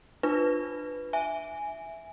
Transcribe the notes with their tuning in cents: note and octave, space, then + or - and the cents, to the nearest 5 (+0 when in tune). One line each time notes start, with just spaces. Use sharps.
D4 +30 F4 +15 B4 +0
E5 +0 G#5 +0